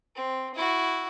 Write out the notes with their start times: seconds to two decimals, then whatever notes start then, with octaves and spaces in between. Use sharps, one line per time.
0.15 C4
0.54 E4 F#4